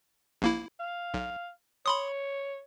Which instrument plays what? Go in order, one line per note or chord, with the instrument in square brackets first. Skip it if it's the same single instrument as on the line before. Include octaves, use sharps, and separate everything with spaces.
[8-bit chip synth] A#1 A#3 E4
[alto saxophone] F5
[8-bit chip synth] B1
[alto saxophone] C#5 [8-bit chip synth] B5 C6 D#6